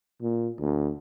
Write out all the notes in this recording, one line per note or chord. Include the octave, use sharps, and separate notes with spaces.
A#2
D2